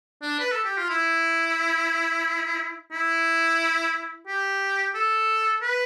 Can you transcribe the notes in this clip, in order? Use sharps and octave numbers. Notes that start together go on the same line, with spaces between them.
D4
B4
A4
G4
F4
E4
E4
G4
A4
B4